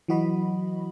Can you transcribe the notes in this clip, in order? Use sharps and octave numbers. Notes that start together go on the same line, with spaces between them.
E3 F#3 F#4 D#5 B5